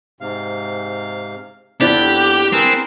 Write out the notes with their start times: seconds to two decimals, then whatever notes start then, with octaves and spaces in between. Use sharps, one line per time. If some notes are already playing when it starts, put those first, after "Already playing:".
0.21 G#2 C3 F5
1.81 F2 B3 D4 E4 G4 D5 F#6
2.53 C4 G#4 A#4 B4